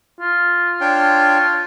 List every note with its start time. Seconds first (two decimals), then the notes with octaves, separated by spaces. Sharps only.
0.21 F4
0.81 D4 C#5 G5